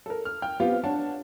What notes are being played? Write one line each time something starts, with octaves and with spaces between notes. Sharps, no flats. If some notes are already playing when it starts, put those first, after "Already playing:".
A4 A#4
F6
G5 F6
B3 C4 F4 G4
D4 C#5 F#5 A5